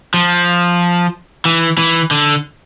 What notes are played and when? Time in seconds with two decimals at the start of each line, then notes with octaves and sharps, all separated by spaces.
0.14 F3
1.45 E3
1.78 E3
2.11 D3